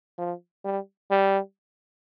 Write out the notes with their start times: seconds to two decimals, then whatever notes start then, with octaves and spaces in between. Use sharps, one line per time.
0.18 F3
0.65 G3
1.11 G3